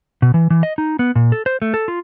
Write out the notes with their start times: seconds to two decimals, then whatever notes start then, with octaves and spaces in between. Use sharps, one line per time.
0.22 B2
0.34 E3
0.50 E3
0.63 D#5
0.78 D#4
0.99 B3
1.16 A#2
1.32 A4
1.46 C5
1.62 A3
1.74 A4
1.88 F4